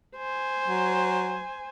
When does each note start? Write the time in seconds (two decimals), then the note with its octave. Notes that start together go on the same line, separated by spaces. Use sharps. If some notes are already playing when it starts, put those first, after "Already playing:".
0.17 C5 G#5
0.68 F#3